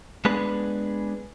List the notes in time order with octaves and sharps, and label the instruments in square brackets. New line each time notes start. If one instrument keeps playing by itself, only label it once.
[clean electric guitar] G#3 B3 D4 G#4 B4